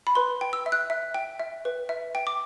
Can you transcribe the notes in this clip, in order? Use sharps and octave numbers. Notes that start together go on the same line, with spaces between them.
B5
B4 C6
G5
E6
E5
F#6
E5
G5
E5
B4
E5
G5
D6